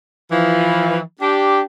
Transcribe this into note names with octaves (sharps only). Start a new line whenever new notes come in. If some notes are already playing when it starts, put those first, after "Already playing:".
E3 F3
D4 G4